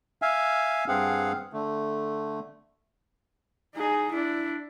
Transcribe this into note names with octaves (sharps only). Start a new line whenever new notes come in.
E5 F5 G#5
G2 C4 G#4 F5 F#5
D3 A3
D#4 G#4
D4 E4